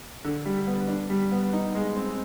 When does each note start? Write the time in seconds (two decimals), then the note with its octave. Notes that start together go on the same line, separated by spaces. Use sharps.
0.24 D3
0.45 G3
0.67 B3
0.88 D4
1.10 G3
1.31 B3
1.53 D#4
1.75 G#3
1.96 C4